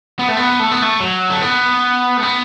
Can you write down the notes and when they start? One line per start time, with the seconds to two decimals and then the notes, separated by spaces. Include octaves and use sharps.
0.19 B3
0.28 A3
0.37 B3
0.59 A3
0.71 B3
0.82 A3
1.00 F#3
1.30 A3
1.42 B3
2.18 A3
2.23 B3